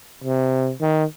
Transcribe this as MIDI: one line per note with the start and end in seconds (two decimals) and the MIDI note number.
0.24 0.72 48
0.81 1.04 51